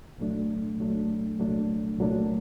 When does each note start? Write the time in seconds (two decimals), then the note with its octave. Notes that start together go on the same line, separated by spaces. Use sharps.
0.18 C2 A#2 F#3 A3 D4
0.78 C2 A#2 F#3 A3 D4
1.38 C2 A#2 F#3 A3 D4
1.99 C2 A#2 F#3 A3 D4